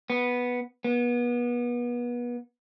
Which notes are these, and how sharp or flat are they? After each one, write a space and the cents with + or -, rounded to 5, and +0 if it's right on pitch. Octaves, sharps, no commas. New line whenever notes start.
B3 -5
B3 -30